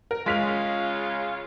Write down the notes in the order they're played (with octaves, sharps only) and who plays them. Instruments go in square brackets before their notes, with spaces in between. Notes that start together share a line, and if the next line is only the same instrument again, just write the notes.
[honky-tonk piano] A#4
[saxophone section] C#3 F4 [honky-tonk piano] G#3 B6 F7